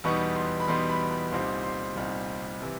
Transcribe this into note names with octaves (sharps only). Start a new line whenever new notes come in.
E2 B2 G3 B3 D#4 C#6
C6
B5
E2 B2 G3 B3 D#4 C6
B5
B5
C2 A#2 G3 C4 D#4 C6
C6
C2 A#2 G3 C4 D#4
C3 E3 G3